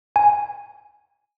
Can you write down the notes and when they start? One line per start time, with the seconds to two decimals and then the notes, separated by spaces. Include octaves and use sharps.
0.16 G#5